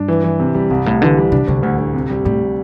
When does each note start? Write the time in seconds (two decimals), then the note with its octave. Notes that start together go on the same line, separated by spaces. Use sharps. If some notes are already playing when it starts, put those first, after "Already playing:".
Already playing: G2 D4
0.08 E3
0.24 E3
0.40 C3
0.55 E2 G3
0.70 C2 G2
0.86 C2 A2
1.02 D3 E3
1.17 G3
1.32 C3 D4
1.47 D2 C3
1.63 D2 A2
1.78 D2
1.94 C3
2.10 G3
2.25 A2 G3